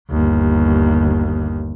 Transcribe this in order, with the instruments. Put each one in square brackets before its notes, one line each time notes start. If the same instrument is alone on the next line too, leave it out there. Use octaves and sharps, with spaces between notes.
[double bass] G1 D#2